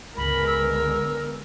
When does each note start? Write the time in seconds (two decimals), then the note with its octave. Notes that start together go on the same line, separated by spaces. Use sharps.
0.17 G1 C#2 D3 G#3 B3 A#4 B5
0.47 E6